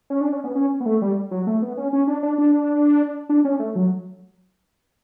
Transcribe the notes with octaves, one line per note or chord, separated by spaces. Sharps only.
C#4
D4
C#4
B3
C#4
B3
A3
G3
F#3
A3
B3
C#4
C#4
D4
D4
D4
D4
C#4
A3
F#3